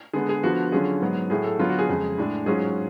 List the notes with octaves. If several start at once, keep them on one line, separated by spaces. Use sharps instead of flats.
D3 G#3 B3 G#4
G#4
D3 F3 B3 F4 F#4
D3 F#3 C#4 F4 G#4
G#2 F#3 B3
A2 F#3 A3 G#4
A4
D3 F#3 B3 F4
F#4
G#4
F2 C#3 G#3
A2 G#3 D4
G#2 F#3 C#4 F4 G#4